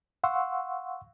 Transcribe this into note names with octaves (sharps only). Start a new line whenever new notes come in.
F5 F#5 C6 C#6 E6